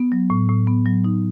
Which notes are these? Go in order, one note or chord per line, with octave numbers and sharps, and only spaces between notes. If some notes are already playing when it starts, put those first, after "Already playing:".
Already playing: B3
F#3
A2
A2
B3
F#3
D#4